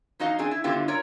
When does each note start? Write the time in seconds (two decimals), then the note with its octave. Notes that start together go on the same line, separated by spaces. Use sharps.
0.20 E2 D#4 F#4 D#5 F5
0.39 C4 D4 G#4
0.51 E4
0.64 G2 D3 B3 E4 F4 G4
0.88 F4 A#4 C#5 D5 A#5